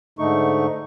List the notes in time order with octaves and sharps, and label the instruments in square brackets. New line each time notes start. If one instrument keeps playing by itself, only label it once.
[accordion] G#2 D3 A3 D#4 C#6